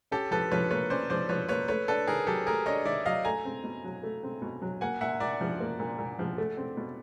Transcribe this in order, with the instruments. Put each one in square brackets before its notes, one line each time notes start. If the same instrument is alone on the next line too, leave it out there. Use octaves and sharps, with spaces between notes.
[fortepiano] C#4 [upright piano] G4 A4
[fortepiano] F3 [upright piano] A4 B4
[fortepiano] F3 [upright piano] B4 C#5
[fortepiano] A#3 [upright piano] B4 C#5
[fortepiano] C#4 [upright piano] C5 D5
[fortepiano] F3 [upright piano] C5 D5
[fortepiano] F3 [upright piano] B4 C#5
[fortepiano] A#3 [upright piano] B4 C#5
[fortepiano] A3 [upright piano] B4 C#5
[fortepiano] D4 [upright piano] A4 B4
[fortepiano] D#3 [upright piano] G#4 A#4
[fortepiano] F#3 [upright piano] G4 A4
[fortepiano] A3 [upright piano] G#4 A#4
[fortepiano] D4 [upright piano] C#5 D#5
[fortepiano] D#3 [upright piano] D5 E5
[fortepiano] F#3 [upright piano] D#5 F5
[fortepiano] A3 [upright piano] G#5 A#5
[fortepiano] C4
B2
F#3
A3
C4
B2
F#3
[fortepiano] A#3 [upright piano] F#5 G#5
[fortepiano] A#2 [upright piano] E5 F#5
[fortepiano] A#2 [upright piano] D5 E5
[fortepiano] F3
A#3
A#2
A#2
F3
A3
C4
B2